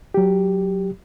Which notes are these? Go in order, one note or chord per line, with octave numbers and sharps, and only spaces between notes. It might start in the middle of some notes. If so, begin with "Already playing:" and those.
F#3 G4